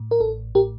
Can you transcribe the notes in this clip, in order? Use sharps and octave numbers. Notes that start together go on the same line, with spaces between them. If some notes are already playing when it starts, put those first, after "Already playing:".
Already playing: A2
A#4
A1 A4
A2 G4 A#4